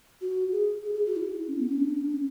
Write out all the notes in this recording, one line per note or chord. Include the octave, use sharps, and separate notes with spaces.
F#4
G#4
G#4
G#4
F#4
E4
C#4
B3
C#4
D4
C#4